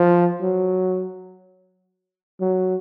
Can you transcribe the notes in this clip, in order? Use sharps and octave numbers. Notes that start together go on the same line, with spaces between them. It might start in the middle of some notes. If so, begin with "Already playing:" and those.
Already playing: F3
F#3
F#3